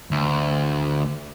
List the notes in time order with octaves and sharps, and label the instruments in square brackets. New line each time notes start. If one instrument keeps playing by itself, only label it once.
[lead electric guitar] D2